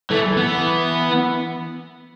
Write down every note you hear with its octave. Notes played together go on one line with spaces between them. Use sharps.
E3 A3
B3